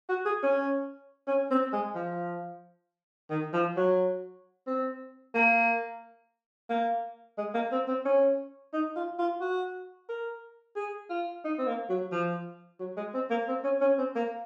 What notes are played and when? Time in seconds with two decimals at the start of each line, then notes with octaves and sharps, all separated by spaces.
0.09 F#4
0.26 G#4
0.43 C#4
1.27 C#4
1.51 C4
1.73 G#3
1.95 F3
3.30 D#3
3.53 F3
3.77 F#3
4.67 C4
5.35 A#3
6.70 A#3
7.38 G#3
7.55 A#3
7.72 C4
7.88 C4
8.05 C#4
8.73 D#4
8.96 F4
9.19 F4
9.41 F#4
10.09 A#4
10.76 G#4
11.10 F4
11.45 D#4
11.59 C4
11.67 A#3
11.89 F#3
12.12 F3
12.80 F#3
12.97 G#3
13.14 C4
13.30 A#3
13.48 C4
13.64 C#4
13.81 C#4
13.98 C4
14.15 A#3